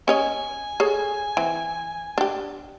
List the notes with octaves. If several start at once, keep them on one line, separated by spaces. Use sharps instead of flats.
C#4 C#5 D#5 G#5
G#4 A4 C#5
E3 C4
D4 G4